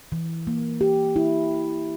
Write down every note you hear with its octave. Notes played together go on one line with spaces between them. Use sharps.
E3
A#3
G4
E4